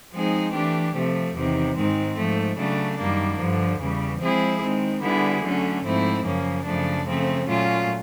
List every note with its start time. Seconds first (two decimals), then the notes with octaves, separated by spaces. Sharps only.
0.12 F3 G#3 C4 D#4 G#4
0.52 E3 A3 D4 G4
0.94 C3 F3 A3
1.34 E2 C3 D#3
1.75 G#2 D#3 G#3 C4
2.16 G#2 F3 A3
2.57 C#3 F#3 A3 D4
2.97 F#2 D#3 G3 A#3 D4
3.38 G2 D3 F3
3.79 E2 C#3 E3 G3
4.20 F3 G#3 C4 E4 G#4
4.60 D#3 G#3 C4
5.01 D3 G3 B3 E4 G#4
5.42 D3 F#3 A3 C#4
5.84 G#2 F3 A3 C4 E4
6.23 F#2 C#3 F3 A#3 C#4
6.64 F#2 C#3 F3 A3 D4
7.06 C#3 F3 A3 C4
7.47 A#2 F#3 A3 C#4 F4